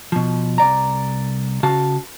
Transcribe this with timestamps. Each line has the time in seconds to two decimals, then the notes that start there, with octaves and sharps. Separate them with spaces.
0.12 B2 F3
0.58 C2 D5 A#5
1.63 C#3 F#4 F5 A5